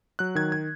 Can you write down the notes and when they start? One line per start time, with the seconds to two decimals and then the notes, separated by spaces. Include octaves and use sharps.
0.19 F#3 F#6
0.35 D#3 G#6
0.52 G#6